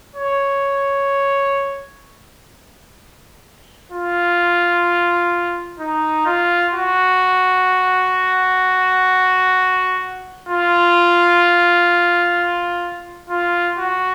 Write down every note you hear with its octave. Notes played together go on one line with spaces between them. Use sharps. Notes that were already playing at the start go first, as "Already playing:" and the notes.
C#5
F4
D#4
F4
F#4
F4
F4
F#4